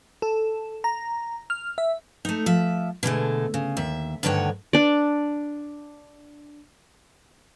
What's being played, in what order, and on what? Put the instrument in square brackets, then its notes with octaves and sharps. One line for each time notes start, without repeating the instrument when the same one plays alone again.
[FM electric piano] A4
A#5
F6
E5
[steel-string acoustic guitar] A3 D#4
F3 E5
B2 D3 G#3 A3
C#3
D#2 E5
D2 G2 D3 D#3 C#5 F#5
[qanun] D4 D5